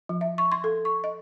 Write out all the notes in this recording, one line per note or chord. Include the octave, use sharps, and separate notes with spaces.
F3
E5
C#6
C6
A4
C#6
D#5